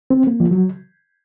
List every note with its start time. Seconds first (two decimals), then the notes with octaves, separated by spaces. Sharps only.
0.10 C4
0.27 A#3
0.40 F3
0.51 F#3